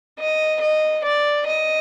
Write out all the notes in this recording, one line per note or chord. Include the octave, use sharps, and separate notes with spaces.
D#5
D#5
D5
D#5